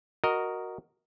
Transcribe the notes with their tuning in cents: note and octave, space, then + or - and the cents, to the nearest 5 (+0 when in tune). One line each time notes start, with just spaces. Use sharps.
F#4 +0 A#4 +0 D#5 +0